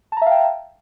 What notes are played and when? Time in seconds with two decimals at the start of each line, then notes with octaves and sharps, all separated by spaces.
0.12 A5
0.17 A#5
0.22 E5
0.26 F5
0.31 G5